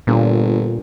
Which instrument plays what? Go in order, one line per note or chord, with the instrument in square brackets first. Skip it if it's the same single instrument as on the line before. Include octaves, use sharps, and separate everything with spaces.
[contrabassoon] G1 [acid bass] A#2